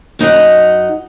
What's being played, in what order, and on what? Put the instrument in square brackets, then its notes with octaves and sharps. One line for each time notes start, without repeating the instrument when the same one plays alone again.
[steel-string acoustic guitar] F#2 D#4 D#5 F#5